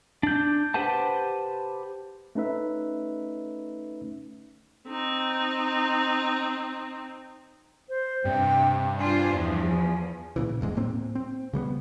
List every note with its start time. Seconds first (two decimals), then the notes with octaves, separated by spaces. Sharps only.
0.23 D4 G6
0.74 G4 B4 C5 F#5 A5
2.35 A3 C#4 D#4 B4 E5
4.88 C4 D#4
7.89 C5
8.25 G2 C3 G5
8.99 D4 F4 C5 G#5
9.34 E2 F3
9.69 G#5
10.36 A#2 C#3 E3
10.61 D#1 E2 G#2 G#3
10.77 A2 A#3 C4
11.15 C4
11.53 C#3 G3 A#3 B3